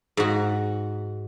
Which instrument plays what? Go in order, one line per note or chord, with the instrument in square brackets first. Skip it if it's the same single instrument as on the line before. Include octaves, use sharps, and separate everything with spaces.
[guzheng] G#2 F#4